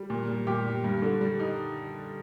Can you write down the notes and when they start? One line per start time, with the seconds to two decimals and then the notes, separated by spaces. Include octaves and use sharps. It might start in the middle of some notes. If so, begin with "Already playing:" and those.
Already playing: G3
0.10 A#2
0.28 G3
0.47 A#2 G4
0.65 G3
0.84 G2
1.02 D3
1.21 G3
1.40 D#4